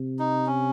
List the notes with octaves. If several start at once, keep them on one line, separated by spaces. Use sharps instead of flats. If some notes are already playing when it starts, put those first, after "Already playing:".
Already playing: C3
D#4
C#4